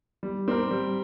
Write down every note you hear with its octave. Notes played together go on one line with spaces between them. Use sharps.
G3
C4 G4 A#4
G3